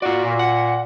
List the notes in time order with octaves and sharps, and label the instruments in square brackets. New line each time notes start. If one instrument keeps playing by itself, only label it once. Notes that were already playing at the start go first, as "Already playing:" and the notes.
[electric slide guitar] F4 D5 [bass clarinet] F#4
[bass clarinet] A#2
[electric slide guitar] F#5